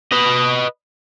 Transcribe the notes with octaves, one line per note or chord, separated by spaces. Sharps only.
B4 D#5